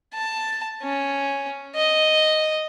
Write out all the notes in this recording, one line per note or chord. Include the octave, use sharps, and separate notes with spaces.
A5
C#4
D#5